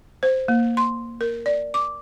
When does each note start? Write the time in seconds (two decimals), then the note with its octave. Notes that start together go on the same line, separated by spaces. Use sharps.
0.23 C5
0.48 A#3
0.77 C6
1.21 A#4
1.46 D5
1.74 D6